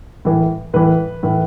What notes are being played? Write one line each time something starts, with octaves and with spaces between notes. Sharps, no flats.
A2 E3
A2 E3 B4
A2 E3